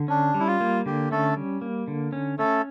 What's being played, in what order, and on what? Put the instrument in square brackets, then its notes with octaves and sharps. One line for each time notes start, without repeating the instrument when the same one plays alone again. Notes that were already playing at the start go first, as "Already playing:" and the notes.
Already playing: [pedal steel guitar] D3
[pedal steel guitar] C#4 [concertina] D4
[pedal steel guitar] G3
[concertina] E4
F4
[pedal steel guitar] A#3
[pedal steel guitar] D3 [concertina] G4
[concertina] A3 A4 [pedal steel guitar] C#4
[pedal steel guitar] G3
A#3
D3
C#4
[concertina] A3 A4 [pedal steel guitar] C#4